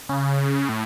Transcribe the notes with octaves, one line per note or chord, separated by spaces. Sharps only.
C#3
A2